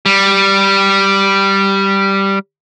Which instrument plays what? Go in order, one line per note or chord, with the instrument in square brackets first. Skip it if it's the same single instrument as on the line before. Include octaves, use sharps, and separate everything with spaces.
[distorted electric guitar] G3